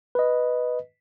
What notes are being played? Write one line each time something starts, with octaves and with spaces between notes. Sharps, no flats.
B4 D#5